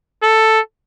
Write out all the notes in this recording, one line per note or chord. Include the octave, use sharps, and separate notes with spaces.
A4